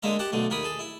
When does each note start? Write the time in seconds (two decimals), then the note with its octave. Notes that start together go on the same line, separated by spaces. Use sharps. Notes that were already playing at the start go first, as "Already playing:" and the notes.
0.03 D3 G#3 A#3 E5 A#5
0.19 G4 F#5 A5
0.32 B1 D3 A3
0.50 D#2 A#4 B5 D#6
0.63 G#4 A4
0.79 E4